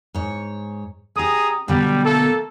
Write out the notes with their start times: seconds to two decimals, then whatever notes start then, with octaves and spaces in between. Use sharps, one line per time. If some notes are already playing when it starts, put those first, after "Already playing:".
0.14 G#2 C#5
1.16 C#4 G4 G#4 A#5 D#6
1.68 B2 D3 F#3 G3
2.04 A3 A#3 A4